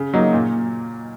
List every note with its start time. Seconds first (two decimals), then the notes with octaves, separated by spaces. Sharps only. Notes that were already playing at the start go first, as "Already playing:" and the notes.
Already playing: C#3
0.13 F#3 A#3 D#4
0.33 A#2